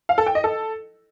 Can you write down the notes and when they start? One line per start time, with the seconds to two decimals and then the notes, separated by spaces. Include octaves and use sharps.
0.09 F5
0.18 A4
0.26 G5
0.35 D#5
0.44 A4